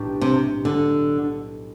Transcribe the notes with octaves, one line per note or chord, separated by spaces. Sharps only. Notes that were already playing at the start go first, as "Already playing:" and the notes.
Already playing: B1 A2 G3 D4 G4
C3
D3